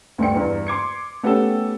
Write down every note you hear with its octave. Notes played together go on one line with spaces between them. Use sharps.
D2 G2 G5 C#7
E2 G2 A#5
C6 D6 G#6 C#7
A3 B3 C#4 G4 A4